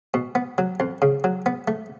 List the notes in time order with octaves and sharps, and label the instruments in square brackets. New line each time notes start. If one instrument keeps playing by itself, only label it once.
[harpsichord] B2
B3
F#3
F2
C#3
F#3
B3
A3